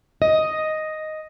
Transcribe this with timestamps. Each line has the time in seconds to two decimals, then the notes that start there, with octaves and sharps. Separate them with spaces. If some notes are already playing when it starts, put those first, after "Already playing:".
0.22 D#5